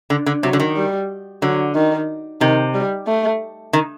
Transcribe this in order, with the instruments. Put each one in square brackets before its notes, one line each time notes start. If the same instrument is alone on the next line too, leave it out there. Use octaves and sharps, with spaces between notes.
[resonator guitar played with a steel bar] D3
D3
[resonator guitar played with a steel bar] C3 [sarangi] F#3
[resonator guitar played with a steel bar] D3
D#3
[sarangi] G3
[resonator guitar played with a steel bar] D3 [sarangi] F#3
[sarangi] D#3
[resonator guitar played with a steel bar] C3 [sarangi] D#3
[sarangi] G3
A3
[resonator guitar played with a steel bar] D#3